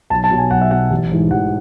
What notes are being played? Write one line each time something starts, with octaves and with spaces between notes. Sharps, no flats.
B1 A5
A5
B2 F#3
G#5
B1 F#5
E5
B2 F#3 F#5
A1
G#2 E3
A1 F#5